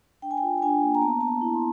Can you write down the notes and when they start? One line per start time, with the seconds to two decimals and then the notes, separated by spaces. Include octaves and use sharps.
0.22 D4 G5
0.31 G#5
0.37 G5
0.43 F4
0.58 G5
0.62 D4 G#5
0.82 A#3
0.95 A#5
1.02 B3 A5
1.21 B3 A5
1.28 A#5
1.41 E4
1.54 C6